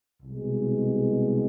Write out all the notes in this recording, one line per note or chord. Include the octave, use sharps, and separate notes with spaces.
C2 B2 G#3